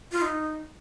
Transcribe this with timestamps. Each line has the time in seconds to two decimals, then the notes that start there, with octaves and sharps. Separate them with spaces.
0.12 F4
0.21 D#4